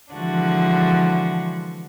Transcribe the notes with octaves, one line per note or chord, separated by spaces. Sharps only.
D3 E3 F3 G#3 D4 F#4